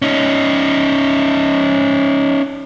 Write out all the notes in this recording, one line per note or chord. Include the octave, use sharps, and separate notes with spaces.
C#4 D#4